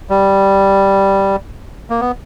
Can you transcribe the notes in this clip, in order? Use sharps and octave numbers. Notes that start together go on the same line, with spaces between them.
G3
A#3
B3